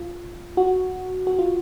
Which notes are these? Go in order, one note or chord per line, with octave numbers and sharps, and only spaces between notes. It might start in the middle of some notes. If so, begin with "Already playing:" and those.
Already playing: F4
F#4
F#4
F4